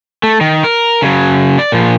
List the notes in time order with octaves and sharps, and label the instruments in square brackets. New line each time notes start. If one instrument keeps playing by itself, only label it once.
[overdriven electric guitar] A3
D#3
A#4
C#3 F#3
D5
A#2 F3